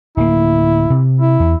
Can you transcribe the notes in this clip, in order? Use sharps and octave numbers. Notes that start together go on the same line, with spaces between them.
D1 A#3 E4
C3
E4
E2